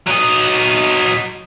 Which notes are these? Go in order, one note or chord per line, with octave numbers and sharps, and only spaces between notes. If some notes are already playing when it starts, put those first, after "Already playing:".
F#3 D#5